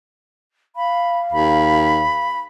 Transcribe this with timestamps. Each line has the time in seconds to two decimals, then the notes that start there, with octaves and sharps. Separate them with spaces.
0.76 F5 B5
1.32 D#2 B5